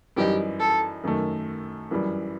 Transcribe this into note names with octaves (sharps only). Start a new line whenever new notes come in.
F#2 E3 G3 D#4 G4
A4
F#2 D#3 A3
F#2 E3 G3